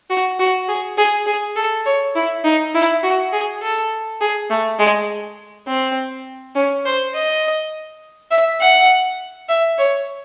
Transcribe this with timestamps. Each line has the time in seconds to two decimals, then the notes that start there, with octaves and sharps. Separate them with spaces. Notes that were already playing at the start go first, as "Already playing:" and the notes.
0.10 F#4
0.39 F#4
0.68 G#4
0.98 G#4
1.26 G#4
1.56 A4
1.85 C#5
2.15 E4
2.44 D#4
2.74 E4
3.03 F#4
3.33 G#4
3.62 A4
4.21 G#4
4.50 A3
4.79 G#3
5.67 C4
6.56 C#4
6.85 C5
7.14 D#5
8.31 E5
8.61 F#5
9.48 E5
9.78 C#5